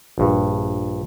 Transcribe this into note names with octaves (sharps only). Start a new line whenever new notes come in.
A#1 G2